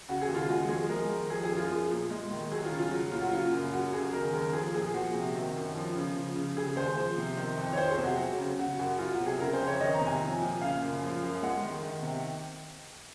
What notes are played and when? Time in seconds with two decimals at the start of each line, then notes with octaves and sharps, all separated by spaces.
0.08 C#3 F#4
0.22 G#4
0.29 D#2
0.35 F4
0.49 G#3 F#4
0.68 F3 G#4
0.89 G#3 A#4
1.09 D#3
1.30 F3 G#4
1.44 G#4
1.50 F#2
1.57 F4
1.71 F3
1.91 A#2
2.10 G#3
2.31 D#3
2.52 F#3 G#4
2.64 F4
2.72 C#3
2.78 F4
2.91 F#3
3.11 A#2 F4
3.22 F#4
3.30 C#3 F4
3.52 F#2
3.73 F#3 F#4
3.93 C#3 G#4
4.13 D#3 A#4
4.33 D#2 A#4
4.53 F3 G#4
4.74 A#2 G#4
4.94 F3 F#4
5.14 C3
5.35 D#3
5.56 F#2
5.76 F3
5.96 C#3
6.16 F3
6.36 C#3
6.57 C#3 G#4
6.76 D#2 C5
6.97 F3
7.17 C3
7.37 D#3
7.57 F2
7.73 C#5
7.78 F3 C5
7.91 G#4
7.98 C3
8.04 F#4
8.18 F#3
8.38 C#3
8.59 C#3 F#4
8.79 F#2 F#4
8.99 F#3 F4
9.12 F#4
9.20 C3
9.26 G#4
9.39 C#3 A#4
9.53 C5
9.60 F2
9.67 C#5
9.80 D#3 D#5
9.93 A#5
10.01 C3
10.07 G#5
10.21 F3
10.41 A#2
10.62 C#3 F5
10.82 F#2
11.02 F3
11.23 F#2
11.42 G#3 F#5
11.63 D#3
11.83 D#3
12.02 C3